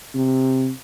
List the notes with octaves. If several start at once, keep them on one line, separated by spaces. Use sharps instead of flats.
C3